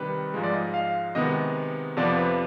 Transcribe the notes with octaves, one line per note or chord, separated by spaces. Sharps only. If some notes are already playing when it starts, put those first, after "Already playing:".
Already playing: C3 D#3 G3 B4
G#2 F3 G#3
D5
D#5
F5
C3 D#3 G#3 B3 D#5
F2 C3 F3 B3 D5
B4